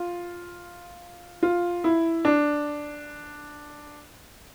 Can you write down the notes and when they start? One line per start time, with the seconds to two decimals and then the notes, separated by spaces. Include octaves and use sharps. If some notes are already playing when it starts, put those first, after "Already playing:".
Already playing: F4
1.43 F4
1.84 E4
2.25 D4